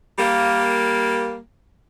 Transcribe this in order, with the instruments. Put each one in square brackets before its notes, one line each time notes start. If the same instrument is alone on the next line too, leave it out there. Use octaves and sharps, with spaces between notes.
[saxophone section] G3 A#3